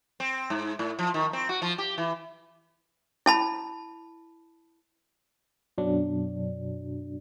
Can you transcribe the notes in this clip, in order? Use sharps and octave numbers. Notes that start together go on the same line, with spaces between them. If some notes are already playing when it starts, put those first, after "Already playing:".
C4
G#2
A2
F3
D#3
C4
F#4
F3
G4
E3
E4 A5 B5
F#2 B2 F#3 D4